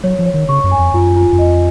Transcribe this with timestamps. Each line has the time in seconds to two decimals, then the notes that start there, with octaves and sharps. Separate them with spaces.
0.03 F#3 C#5
0.19 F3
0.26 C#5
0.34 D#3
0.48 C#3 C#6
0.63 F#2
0.71 G#5
0.79 F2
0.94 F#2 F4
1.16 F4
1.32 F#2
1.39 F2 D#5